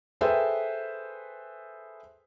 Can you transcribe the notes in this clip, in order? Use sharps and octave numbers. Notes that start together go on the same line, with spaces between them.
G#4 A4 B4 C5 E5 G5